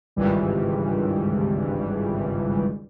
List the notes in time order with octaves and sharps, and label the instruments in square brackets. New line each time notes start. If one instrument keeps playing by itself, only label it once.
[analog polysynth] G#1 C#2 G2 C#3 E3 G3